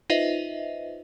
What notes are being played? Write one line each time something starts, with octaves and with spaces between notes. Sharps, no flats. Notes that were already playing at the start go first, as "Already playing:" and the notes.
D#4 F4 B4 C5 D#5 E5